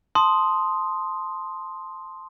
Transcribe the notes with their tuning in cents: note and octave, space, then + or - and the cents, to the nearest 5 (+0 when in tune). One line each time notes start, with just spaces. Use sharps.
A5 +0 C6 +0 D#6 +0